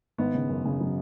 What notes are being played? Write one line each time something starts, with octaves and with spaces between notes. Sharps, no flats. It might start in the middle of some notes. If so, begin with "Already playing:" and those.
G#1 B3
C#3
F#2
C#3
F#3